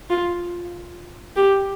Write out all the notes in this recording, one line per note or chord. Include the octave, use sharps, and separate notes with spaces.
F4
G4